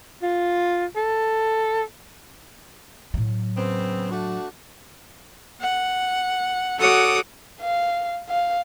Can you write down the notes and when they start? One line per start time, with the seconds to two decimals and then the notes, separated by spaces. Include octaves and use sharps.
0.22 F4
0.96 A4
3.14 A2 F#3
3.57 C#3 B3 C4
4.11 A3 D4 F#4
5.62 F#5
6.79 F#4 A4 C#5 F#5 D6 D#6
7.61 F5
8.29 F5